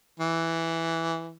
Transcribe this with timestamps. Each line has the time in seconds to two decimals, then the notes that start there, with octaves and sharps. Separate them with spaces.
0.20 E3